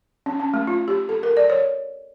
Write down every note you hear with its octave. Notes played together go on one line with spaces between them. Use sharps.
C#4
C#4
A3
F4
G4
A4
A#4
D5
C#5